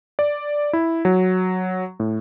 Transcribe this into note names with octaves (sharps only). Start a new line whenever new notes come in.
D5
E4
F#3
A2